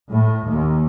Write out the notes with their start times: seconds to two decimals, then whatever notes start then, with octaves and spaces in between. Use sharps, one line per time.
0.11 A2
0.47 D#2